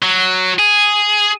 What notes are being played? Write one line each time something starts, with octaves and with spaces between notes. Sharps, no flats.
F#3
G#4